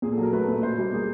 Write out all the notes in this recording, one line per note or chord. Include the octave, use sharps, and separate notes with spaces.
A#2 G#4
A4
F#3
A#4
A3 B4
A#2
B2 C5
G3
A#3 G#4